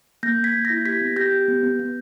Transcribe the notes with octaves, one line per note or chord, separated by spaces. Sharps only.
A#3 G6 A#6
A#3
G#6 B6
A#3
G6 A#6
E4
G4 G#6 B6
B3
G4 G6 A#6
G4
B3
B3
B3